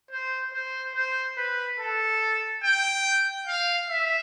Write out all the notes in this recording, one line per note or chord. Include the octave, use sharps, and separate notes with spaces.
C5
C5
C5
B4
A4
G5
F5
E5